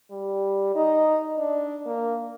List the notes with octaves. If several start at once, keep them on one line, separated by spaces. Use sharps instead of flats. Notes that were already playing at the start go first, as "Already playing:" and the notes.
G3
D#4
D4
A#3